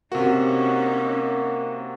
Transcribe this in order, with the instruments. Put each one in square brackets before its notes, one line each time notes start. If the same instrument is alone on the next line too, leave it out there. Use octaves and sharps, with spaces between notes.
[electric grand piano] C3 F#4 [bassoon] A#3 [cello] C#4 D#4